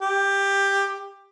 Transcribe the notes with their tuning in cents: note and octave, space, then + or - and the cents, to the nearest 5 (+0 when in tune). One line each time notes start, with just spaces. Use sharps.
G4 +15